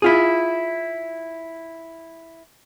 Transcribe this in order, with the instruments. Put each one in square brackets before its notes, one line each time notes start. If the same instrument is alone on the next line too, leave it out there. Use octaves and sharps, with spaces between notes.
[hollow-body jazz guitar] E4 F4 G#4